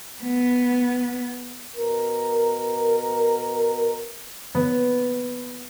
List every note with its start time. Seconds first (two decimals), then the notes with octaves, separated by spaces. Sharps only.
0.22 B3
1.76 B2 A#4
4.55 B3